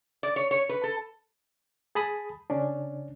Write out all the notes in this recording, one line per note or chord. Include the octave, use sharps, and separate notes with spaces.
D5
C#5
C#5
B4
A4
G#4 A5 B5 D#6
C#3 C#4 D4